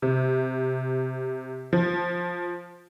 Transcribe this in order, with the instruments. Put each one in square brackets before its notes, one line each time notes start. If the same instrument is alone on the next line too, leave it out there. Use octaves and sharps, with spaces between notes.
[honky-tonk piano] C3
F3